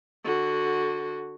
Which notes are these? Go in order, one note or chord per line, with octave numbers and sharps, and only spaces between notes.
D3 F#4